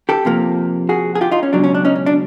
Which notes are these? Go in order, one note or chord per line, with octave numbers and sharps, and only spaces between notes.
G4 A4
C3 F3 A#3
F#4 G#4
G#4
F4 G4
D#4 F4
C#4
C#2 B2 F#3 D4
C#4
D4
C#4 D#4
C#4
D4